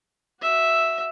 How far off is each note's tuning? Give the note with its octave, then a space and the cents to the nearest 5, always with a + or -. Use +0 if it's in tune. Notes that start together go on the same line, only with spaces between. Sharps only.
F#4 +0 E5 +0